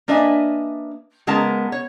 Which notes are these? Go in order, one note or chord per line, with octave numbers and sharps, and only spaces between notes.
A#3 D4 B4 D#5 E5 G#5
C#3 G#3 B3 A#4 A5 A#5
C#5